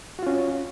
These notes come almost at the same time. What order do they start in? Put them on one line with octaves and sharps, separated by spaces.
F#4 F4 C#4